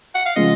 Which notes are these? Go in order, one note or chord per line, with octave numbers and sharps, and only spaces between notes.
F#5
F5
C#3 F3 G#3 D#5